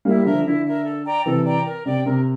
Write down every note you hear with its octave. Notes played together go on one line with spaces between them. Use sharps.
G3 A#3 E4
D3 F3 A#4 E5
D3 E4
A#4 E5
A4
D5 G5 A#5
C3 E3 A4
D5 G5 A#5
A#4
C3 D5 G5
C3 A#4